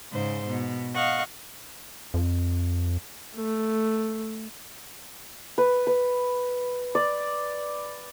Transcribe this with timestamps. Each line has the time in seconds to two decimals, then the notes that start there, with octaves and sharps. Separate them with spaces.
0.12 G#2 C#3 C5
0.48 B2
0.94 D#5 F5 F#5 C#6
2.14 F2
3.36 A3
5.58 B4
5.87 B4
6.95 D5